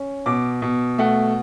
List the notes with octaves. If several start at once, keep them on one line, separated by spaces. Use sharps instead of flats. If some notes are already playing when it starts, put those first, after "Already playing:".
Already playing: C#4
B2 D6
B2
A3 F#5